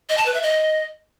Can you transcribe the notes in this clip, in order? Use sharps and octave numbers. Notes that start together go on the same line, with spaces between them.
D#5
A5
B4
E5
D#5